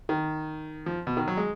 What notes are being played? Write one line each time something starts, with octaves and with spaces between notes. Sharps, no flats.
D#3
F3
B2
D#3
F#3
G#3